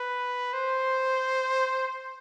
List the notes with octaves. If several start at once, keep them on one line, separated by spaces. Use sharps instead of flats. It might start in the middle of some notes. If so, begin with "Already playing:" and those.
Already playing: B4
C5